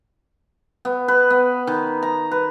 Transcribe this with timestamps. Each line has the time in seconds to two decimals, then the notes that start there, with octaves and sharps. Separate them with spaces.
0.85 B3
1.08 B4
1.30 B3
1.67 D#3
2.03 A#5
2.31 B4